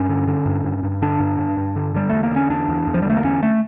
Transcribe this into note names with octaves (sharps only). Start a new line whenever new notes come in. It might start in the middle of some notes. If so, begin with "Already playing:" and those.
Already playing: G2 C#4
D3
D3
G2
G2
G2
D3 D4
G2
G2
G2
D3
D3 G3
E2 A3
A#3
D3 C#4
E2 D4
E2
E2
F3
G3
D3 A3
A#3
E2 C#4
A3